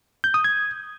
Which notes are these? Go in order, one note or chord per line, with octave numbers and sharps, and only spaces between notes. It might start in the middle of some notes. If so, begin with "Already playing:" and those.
G6
D#6
G#6